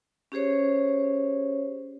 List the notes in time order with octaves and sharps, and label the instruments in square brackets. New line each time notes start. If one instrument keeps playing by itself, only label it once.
[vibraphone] C#4 G4 G#4 C5 C#5